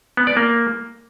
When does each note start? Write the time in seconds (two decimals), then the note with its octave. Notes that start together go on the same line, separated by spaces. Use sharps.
0.17 B3
0.27 D5
0.37 A#3